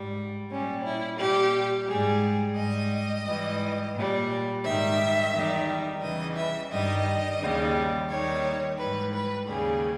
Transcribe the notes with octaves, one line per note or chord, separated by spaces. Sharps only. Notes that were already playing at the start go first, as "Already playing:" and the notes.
Already playing: G#2 G3
A#2 G3 C#4
E4
A#2 G3 G4
G#2 G3 G#4
G#2 G3 D#5
G#2 E3 G3
A#2 G3
G#2 D#3 G3 E5
E2 D#3 G3
E2 C#3 E3 G3 D#5
E5
G2 D#3 G3 D#5
D#2 C#3 G3
D#2 D#3 G3 C#5
G#2 E3 G3 B4
B4
D#2 C#3 G3 G#4